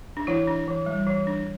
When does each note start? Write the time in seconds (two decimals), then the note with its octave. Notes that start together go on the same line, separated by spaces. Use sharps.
0.17 D4
0.27 E3 E4
0.47 D4
0.68 E3
0.86 G3
1.07 E3
1.27 D4